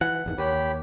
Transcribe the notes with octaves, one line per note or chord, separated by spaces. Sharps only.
E3 F#5
G#1 E2 D#3
D#2 G4 C#5 B5